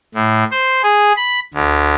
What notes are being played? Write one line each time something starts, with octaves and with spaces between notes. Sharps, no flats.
A2
C5
G#4
B5
D2